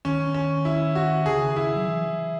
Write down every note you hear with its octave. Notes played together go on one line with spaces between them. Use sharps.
D#3 C#4
C#4
E4
F#4
C#3 G#4
E4
F#3
E3